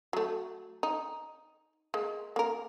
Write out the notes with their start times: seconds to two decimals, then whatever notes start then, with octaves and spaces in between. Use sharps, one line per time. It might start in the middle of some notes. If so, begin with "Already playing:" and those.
0.13 F#3 A3
0.83 D#4
1.94 G#3 A#3
2.36 A#3 A#4